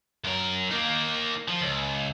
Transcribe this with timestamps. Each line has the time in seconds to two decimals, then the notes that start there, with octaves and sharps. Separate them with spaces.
0.24 F#2 A#4
0.71 A#3 D#4
1.48 F3
1.61 C#2